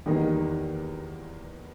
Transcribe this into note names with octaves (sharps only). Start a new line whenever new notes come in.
E2 D#3 G3 A#3 D#4